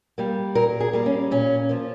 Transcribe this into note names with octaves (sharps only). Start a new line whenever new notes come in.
G3 A#3
A#2 A#4
G#4
G3 A#3
C#4
A#2 C#4
F3 A#3